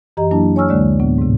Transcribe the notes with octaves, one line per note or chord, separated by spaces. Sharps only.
F#2 E3 G4 D#5 A#5
F#3 A#3 D4 E4 A5
C#5 G#5 C#6 E6 F6
D2 D3 G#3 A#3 D5
D2 A2 B3
G#2 C3